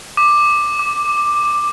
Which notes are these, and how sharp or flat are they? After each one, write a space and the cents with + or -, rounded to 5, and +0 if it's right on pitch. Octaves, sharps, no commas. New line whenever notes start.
D6 +10
D6 -5